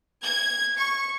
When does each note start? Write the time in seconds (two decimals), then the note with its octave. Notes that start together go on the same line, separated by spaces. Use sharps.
0.23 G#6
0.78 C#6